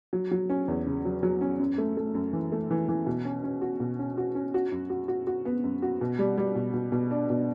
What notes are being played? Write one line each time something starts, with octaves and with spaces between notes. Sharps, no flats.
F#3
F#3
C#4
E2
C#3
F#3
F#3
C#4
F#2
A3
A3
F#2
E3
A3
E3
E3
B2
C#4
C#4
F#4
B2
C#4
F#4
C#4
F#4
F#2
F#4
F#4
F#4
B3
F#2
F#4
B2
G3
G3
B2
B2
B2
D4
B2